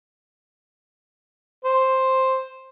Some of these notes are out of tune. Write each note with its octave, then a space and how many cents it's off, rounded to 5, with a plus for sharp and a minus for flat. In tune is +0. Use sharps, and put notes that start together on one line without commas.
C5 +5